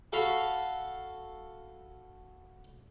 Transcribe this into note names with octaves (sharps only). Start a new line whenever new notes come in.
F#4 A4 F5 B5